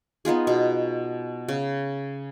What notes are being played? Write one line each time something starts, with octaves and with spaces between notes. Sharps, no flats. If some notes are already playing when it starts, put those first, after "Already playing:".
B3 D#4 F4 G#4
B2
C#3